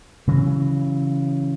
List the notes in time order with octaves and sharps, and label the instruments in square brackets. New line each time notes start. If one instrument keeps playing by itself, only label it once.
[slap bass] C#3 E3 F#3